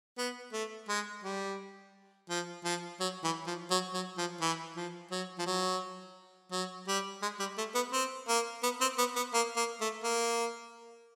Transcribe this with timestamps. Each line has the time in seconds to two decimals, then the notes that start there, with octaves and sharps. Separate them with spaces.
0.18 B3
0.53 A3
0.89 G#3
1.24 G3
2.30 F3
2.64 F3
3.00 F#3
3.24 E3
3.47 F3
3.71 F#3
3.94 F#3
4.18 F3
4.41 E3
4.76 F3
5.11 F#3
5.39 F3
5.46 F#3
6.52 F#3
6.88 G3
7.22 G#3
7.40 G3
7.58 A3
7.75 B3
7.93 C4
8.28 A#3
8.63 B3
8.81 C4
8.98 B3
9.16 B3
9.34 A#3
9.57 A#3
9.81 A3
10.04 A#3